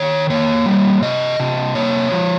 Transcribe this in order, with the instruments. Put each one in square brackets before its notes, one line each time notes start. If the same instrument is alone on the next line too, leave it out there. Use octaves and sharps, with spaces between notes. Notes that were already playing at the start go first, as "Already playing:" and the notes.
Already playing: [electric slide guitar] D#3 C#5
A#3 C#5
G3
C3 D#5
C3
A#3 C#5
F3